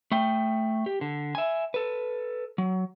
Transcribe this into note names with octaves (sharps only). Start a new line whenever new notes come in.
A3 G5
G4
D3
E5 G#5
A4 B4
F#3